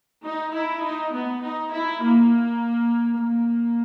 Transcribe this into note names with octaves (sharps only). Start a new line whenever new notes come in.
D#4
E4
D#4
B3
D#4
E4
A#3
A#3